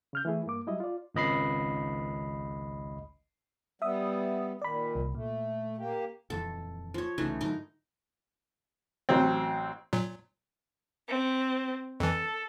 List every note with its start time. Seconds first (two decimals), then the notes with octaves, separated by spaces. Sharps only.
0.13 C#3 F6 G6
0.25 E3 A3 E4 G#4
0.46 G2 A#3 D6
0.67 F#3 G3 E4 D#5
0.80 F4 D5
1.15 G#1 C#2 D#5 B5 C7
3.82 G3 B3 E5 D#6
4.62 A#2 D#3 D5 B5
4.95 C2
5.15 A#2 A3
5.78 A#3 G4
6.30 D#1 F2 E3 A4
6.94 F3 C#5
7.18 C2 C#3 E3 A3 D#4
7.41 G#2 D3 F#3 D#4 A#4
9.09 A1 F#3 C4
9.93 A#2 F#3
11.08 C4
12.00 F2 E3 A4